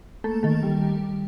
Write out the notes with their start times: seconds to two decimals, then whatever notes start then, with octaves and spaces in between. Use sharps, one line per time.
0.24 A3 A#3 A4
0.43 D#3 A3 A4
0.63 G3